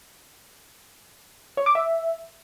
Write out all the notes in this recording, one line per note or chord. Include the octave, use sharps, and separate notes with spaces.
C#5
D6
E5